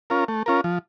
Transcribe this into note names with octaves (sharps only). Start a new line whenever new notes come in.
C#4 F4 A#4
A3
C#4 F4 A#4
F3